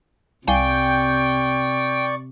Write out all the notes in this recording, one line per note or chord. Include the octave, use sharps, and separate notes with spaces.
C2 C3 D5 F5 G5 G#5 C#6